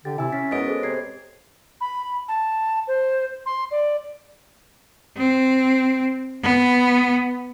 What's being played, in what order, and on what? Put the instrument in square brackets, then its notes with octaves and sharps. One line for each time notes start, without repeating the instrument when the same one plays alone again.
[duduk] D3 [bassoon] G4 [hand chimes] A6
[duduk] C3 [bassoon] E4 [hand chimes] G#5 E6
[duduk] C#4 [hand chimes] A6 B6
[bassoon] F#2 [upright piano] G#3 B3 D#5 [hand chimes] A6 D7
[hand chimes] G#4 A4 C5
[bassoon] C3 [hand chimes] C#5 G#6 C7
[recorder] B5
A5
C5
C6
D5
[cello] C4
B3